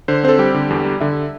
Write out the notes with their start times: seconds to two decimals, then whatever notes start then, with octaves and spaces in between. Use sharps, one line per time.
0.08 D3 C5
0.24 C4 C5
0.29 A4
0.39 G3 G4
0.54 D3
0.70 E2
0.85 G3
1.00 D3 E5